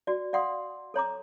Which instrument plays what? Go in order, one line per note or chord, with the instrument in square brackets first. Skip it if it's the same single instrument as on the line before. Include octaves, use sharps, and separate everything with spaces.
[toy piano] F#4 D5
D5 F5 F#5 C6 D#6
A4 C#5 A#5 D6